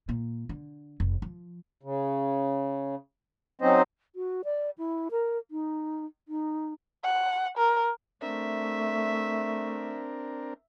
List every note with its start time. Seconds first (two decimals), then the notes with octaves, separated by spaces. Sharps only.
0.09 A#2
0.49 D3
1.00 F1
1.22 F3
1.83 C#3
3.61 F#3 C4 C#4 D#4 C5 D#5
4.16 F#4
4.45 D5
4.78 E4
5.11 A#4
5.51 D#4
6.28 D#4
7.04 F#5
7.57 A#4
8.22 A3 C4 D4 A#4 E5